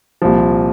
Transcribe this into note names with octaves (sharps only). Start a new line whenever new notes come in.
C2 A#2 F3